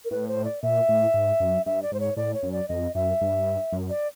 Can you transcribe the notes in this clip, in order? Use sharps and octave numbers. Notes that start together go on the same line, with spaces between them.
A#4
A2 B4
C5
D5
A#2 E5
A2
G#2
F#2
G2 E5
D5
G#2 C5
C#5
A2 D5
C#5
F#2
D5
F2 D#5
F#2 E5
G2
F#2
D5